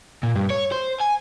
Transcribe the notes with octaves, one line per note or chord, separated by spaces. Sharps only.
A#2
G2
C#5
C5
G#5